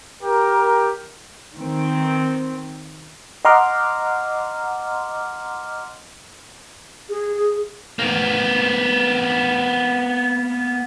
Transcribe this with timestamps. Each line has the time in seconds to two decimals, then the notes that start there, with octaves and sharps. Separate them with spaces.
0.22 G4 A#4
1.57 D#3 C4
3.45 D#5 F#5 A#5 C6 D6 F6
7.09 G#4
7.99 A#3 B3